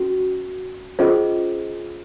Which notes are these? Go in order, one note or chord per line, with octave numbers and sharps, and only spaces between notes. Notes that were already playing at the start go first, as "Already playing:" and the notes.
Already playing: C#4 F#4
C#4 F4 G#4 C5 D#5